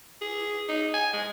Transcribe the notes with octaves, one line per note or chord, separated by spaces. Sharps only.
G#4
D#4
G#5
G#3